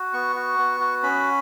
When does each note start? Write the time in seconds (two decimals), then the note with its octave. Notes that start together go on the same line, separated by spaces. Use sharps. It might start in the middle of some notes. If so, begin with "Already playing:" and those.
Already playing: F#4
0.13 B3 C#6
0.36 F#4
0.59 B3
0.80 F#4
1.03 C#4 B5